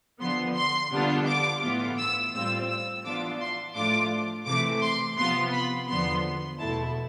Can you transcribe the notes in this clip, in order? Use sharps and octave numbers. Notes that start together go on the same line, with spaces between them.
D3 F3 B3 C6
C6
D3 G3 B3 D4 F4
D6
A2 E3 B3 F4
E6
A2 G3 C4 F4 E6
E6
E3 B3 D4 F4 D6
C6
A2 F3 A3 D4 F4 D6
C3 E3 A3 D6
C6
C3 F3 B3 F4 C6
B5
E2 D3 F3 B3 C6
E2 B2 A3 E4 A5